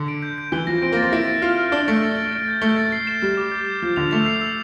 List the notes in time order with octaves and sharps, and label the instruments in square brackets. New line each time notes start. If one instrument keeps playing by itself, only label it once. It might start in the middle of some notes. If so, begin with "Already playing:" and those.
Already playing: [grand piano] D3
[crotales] D7
G6
G6
[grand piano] E3 [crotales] G7
[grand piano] F3 [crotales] A#6
[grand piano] C4 [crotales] D7
[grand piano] A#3
[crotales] A6
[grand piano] C4
[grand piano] E4 [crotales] D7
[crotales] D7
[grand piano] F4 [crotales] F6
[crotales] F6
[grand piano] D4 [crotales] G7
[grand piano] A3 [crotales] D7
[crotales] A6
A6
D7
G6
[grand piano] A3 [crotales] G7
[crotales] A6
C7
E7
[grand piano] G3 [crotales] F6
[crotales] D6
G6
G6
[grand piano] F3 [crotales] G6
[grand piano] D3 [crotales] F7
[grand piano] A3 [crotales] F7
[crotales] C7
E6